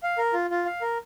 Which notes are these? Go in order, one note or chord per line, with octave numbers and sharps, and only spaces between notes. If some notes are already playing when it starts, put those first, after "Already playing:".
F5
A#4
F4
F4
F5
A#4